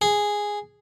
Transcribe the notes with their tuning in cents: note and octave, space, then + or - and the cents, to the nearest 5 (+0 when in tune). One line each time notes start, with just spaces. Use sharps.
G#4 -5